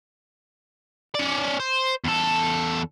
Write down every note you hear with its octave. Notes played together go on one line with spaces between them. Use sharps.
C#4 D5
C5
E2 A4